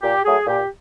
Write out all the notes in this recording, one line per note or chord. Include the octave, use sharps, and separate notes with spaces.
A#2 G4
F#3 A3 G#4
A#2 G4